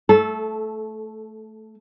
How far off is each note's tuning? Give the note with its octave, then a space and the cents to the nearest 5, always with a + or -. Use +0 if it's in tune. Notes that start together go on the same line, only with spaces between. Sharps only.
A3 +0 A4 -20